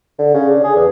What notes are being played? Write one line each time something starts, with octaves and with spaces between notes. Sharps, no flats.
D3
C#3
D4
G#4
E2